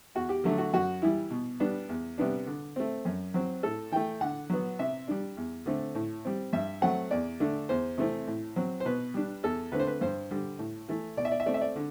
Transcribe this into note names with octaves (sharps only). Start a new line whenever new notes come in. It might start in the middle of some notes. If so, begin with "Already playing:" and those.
E2 F#4
G4
D3 F#3 A3
F#4
F#2 F#4
E3 G3 E4
B2
G3 B3 D4
E2
C3 G3 B3 D4
D3
A3 C4
F#2
F#3 C4
A2 A4
E3 A3 G5
D3 F#5
F#3 B3
C3 E5
G3 D4
E2
D3 A3 C4
A2
G3 C4
G2 E5
F#3 A3 C4 F#5
E2 D5
D3 A3 D4
E2 C5
C3 E3 A3 C4
A2
F#3 C4
C5
B2 B4
G3 D4
E2 A4
D3 A3 C4 B4
C5
B4
G2 C5
D3 G3
A2
E3 A3
B2 D5
E5
D5
E5
A3 C4 D5
E5
D5
D3